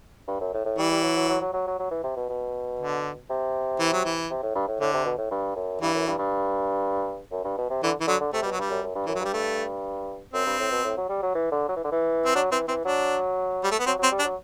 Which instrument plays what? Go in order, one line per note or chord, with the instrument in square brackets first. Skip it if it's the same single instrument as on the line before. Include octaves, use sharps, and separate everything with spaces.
[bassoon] G2
F#2
A2
A2
[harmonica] E3 [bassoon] G3
[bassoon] G3
F#3
F#3
F#3
F#3
F#3
F#3
F#3
E3
C3
B2
B2
[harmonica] D3
[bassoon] C3
[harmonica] E3
F#3
E3
[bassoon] C3
A2
G2
A2
[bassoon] A2 [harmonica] D3
[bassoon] C3
B2
A2
G2
F#2
[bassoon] G2 [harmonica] E3
[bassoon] F#2
G2
G2
F#2
G2
B2
C3
[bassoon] D3 [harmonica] E3
[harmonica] E3
[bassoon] D3 [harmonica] F#3
[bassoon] D3
[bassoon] C3 [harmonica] A3
[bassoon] B2 [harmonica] G3
[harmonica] F#3
[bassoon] G2 [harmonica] G3
[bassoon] F#2
F#2
G2
[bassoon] F#2 [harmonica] E3
[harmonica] F#3
[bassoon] G2 [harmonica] G3
[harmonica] A3
[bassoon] F#2 [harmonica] C4
[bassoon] G2
A2
B2
A2
F#3
G3
F#3
E3
D3
F#3
E3
D3
E3
[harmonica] C4
[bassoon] F#3 [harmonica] D4
[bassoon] E3 [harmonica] C4
[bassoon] E3 [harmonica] C4
[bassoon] F#3 [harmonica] D4
[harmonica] G3
A3
B3
[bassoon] F#3 [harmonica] C4
[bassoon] F#3 [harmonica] C4
[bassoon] G3
[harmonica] D4
[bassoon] F#3